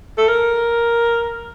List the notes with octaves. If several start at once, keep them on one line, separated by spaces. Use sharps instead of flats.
A4
A#4